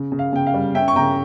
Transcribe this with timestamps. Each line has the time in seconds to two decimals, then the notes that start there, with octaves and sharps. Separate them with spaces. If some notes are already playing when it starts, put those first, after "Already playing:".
Already playing: C#3
0.12 C#3
0.19 F5
0.33 C#3 G5
0.47 F5
0.54 G3
0.75 C#4 E5 G5
0.88 C#6
0.96 C#3 G5 A#5